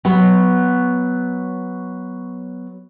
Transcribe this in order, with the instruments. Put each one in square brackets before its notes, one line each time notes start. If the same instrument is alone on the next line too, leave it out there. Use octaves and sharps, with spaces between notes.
[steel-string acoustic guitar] F#3 B3